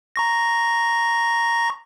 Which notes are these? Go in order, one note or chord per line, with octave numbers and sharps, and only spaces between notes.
A#5 C#6 A#6